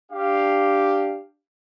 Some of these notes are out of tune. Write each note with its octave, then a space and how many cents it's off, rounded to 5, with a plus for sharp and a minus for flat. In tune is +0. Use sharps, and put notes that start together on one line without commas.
D4 +5 G4 +0 F5 -5